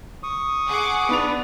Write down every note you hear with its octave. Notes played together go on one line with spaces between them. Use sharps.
C#6 D#6
G#4 F#5 D6
B3 D4 B4 F7